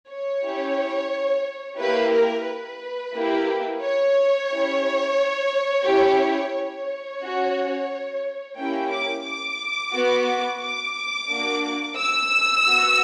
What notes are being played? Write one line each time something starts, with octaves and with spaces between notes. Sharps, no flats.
C#5
C#4 E4 G4
A#3 E4 G4 B4
A#4
B4
A#3 E4 G4
C#5
C#4 E4 G4
C#4 E4 G4
C#5
C#4 F#4
A#3 C#4 E4 G4 G5
D6
D6
B3 F#4
D6
A#3 D4 F#4
E6
B3 F#4